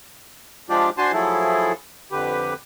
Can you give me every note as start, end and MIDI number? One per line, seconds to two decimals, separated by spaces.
0.70 0.90 53
0.70 0.90 56
0.70 0.90 62
0.70 0.90 65
0.70 0.90 67
0.70 0.90 74
0.98 1.12 62
0.98 1.12 66
0.98 1.12 72
0.98 1.12 80
0.98 1.12 81
0.98 1.12 84
1.13 1.73 53
1.13 1.73 54
1.13 1.73 57
1.13 1.73 64
1.13 1.73 68
1.13 1.73 69
2.12 2.54 41
2.12 2.54 50
2.12 2.54 67
2.12 2.54 71